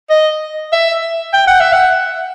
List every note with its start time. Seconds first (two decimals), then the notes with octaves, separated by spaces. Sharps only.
0.10 D#5
0.73 E5
1.33 G5
1.47 F#5
1.60 E5
1.73 F#5